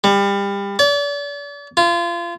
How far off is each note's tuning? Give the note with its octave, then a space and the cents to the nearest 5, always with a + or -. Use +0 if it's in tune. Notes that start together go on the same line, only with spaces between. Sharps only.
G3 +30
D5 -40
F4 -30